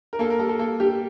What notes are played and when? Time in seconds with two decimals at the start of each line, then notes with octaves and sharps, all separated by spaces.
0.13 A#4
0.19 A#3 A4
0.30 A#4
0.39 G3 A4
0.49 A4
0.59 A#3 A4
0.80 G3 G4